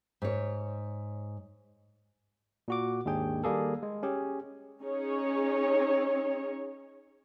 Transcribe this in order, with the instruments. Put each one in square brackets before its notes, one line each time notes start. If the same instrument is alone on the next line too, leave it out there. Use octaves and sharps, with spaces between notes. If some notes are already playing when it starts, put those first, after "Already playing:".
[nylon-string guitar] G#2 C#5
[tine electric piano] A#2 F#4 D6
D#2 G#2 D4 G#4 G5
D#3 G3 A#3 G#4 A4
G#3
C#4 G4 G#4
[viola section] C#4 D#4 G#4 C#5